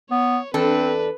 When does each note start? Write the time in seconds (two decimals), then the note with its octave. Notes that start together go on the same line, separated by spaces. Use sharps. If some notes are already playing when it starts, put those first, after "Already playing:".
0.11 B3 C#5
0.54 E2 C4 D4 A4 B4